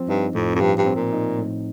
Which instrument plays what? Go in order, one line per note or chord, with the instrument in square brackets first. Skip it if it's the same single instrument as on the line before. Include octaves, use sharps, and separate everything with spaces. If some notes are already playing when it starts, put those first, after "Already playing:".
Already playing: [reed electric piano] F3 C4
[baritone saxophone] G2 [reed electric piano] D#4
[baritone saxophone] F2 [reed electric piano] A2
[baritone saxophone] F2
[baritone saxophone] G2 [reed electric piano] F3
[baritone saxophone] G2
[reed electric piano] C4
[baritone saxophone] A#2
[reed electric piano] D#4
A2